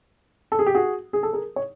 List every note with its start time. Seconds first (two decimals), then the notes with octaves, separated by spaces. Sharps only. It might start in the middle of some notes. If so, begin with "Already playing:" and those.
0.52 A4
0.59 G#4
0.66 G4
0.75 F#4 G#4
1.13 G#4
1.23 A4
1.33 G#4 A#4
1.56 C#5